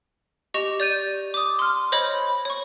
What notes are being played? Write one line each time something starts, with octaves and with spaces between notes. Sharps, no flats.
G4 D#5 C#6 F7
D5 G6 D#7
D6 D#6
C6 F6
C5 C#5 D#5 B5
C#5 C#6